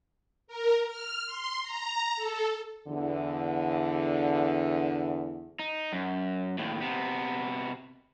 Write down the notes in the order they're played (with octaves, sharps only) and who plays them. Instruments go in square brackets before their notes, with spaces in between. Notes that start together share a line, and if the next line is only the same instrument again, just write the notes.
[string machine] A#4
F6
C6
A#5
A4
[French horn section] E2 D3
[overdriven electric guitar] D#4
F#2
D#2 A2
C3 B3